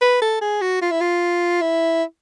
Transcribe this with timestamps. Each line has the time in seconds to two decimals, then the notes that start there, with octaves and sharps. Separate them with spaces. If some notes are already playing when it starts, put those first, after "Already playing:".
0.02 B4
0.22 A4
0.42 G#4
0.61 F#4
0.82 F4
0.91 E4
1.01 F4
1.62 E4